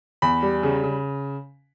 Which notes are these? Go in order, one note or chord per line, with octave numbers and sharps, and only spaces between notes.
E2 B5
G3
C#3
C#3